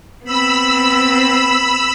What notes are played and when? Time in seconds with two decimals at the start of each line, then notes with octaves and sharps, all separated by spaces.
0.25 B3 C4 B5 E6